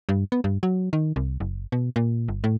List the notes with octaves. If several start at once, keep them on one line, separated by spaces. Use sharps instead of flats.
G2
B3
G2
F#3
D#3
C2
F#1
B2
A#2
G1
A2